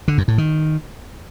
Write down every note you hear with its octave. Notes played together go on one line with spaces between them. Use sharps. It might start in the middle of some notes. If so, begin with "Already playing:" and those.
D3
F#2
A2
D#3